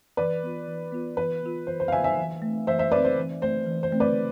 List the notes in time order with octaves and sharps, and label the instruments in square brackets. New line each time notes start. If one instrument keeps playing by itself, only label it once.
[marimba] E3 [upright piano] B4 D5
[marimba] B3 F4
E3
B3 F4
[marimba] E3 [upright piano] B4
[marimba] B3 F4
[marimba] E3 [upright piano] C5
[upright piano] C5
F5
[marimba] B3 F4 [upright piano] E5 G#5
[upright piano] E5 G#5
[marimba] E3
A3
C4
[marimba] E3 [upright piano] C5 E5
[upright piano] C5 E5
[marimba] A3 C4 [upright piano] B4 D5
[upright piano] C5
[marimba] E3
[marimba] A3 C4 [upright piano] C5
[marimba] E3
[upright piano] C5
[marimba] A3 C4
[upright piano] B4 D5